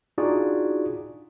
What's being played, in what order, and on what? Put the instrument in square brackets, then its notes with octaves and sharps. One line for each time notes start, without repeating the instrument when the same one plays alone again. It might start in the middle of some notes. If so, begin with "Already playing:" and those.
[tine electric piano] D4 D#4 F4 F#4 G#4 D5